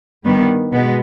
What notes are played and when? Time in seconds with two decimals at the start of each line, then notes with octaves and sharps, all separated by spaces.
0.24 G2 D#3 G3 B3
0.72 B2 G#3 B3